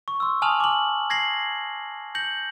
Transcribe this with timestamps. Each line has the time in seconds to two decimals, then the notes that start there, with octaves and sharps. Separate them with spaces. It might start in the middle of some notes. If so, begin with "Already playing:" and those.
0.08 C#6
0.20 C6 E6
0.42 G#5 A5 D#6 F6 F7 F#7
0.60 D6 F#7
1.10 G#6 A#6 C7 F#7
2.15 G6 A#6 C#7 F#7